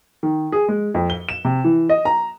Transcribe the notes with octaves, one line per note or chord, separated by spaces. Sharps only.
D#3
G#4
G#3
F2
G7
E7
C3
E3
D#5
A#5